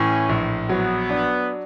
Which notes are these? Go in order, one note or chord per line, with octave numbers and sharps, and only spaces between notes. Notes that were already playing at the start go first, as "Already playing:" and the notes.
Already playing: A2 E3 C#4
A#1
F#3 B3
D4